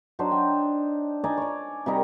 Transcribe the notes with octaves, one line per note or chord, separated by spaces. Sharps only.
F#3 D4 D#4 C5
G5
D#4 D5 G#5
C#5 D5
C3 G3 D#4 A#4